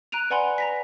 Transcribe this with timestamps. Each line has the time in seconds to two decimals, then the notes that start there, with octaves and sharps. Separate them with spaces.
0.12 A#5 F#6 D7 D#7 F7
0.30 B4 D5 F#5 G#5 B5 C6
0.58 A#5 A#6 B6